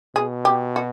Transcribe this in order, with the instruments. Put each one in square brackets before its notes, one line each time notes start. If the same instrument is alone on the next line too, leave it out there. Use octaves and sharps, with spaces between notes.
[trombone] B2 [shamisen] G#4
[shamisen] G4
F#4